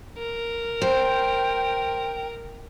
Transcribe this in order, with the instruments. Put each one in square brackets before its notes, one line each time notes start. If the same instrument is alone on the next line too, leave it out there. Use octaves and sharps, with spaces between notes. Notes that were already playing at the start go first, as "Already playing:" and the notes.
[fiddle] A#4
[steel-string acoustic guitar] C5 [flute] G5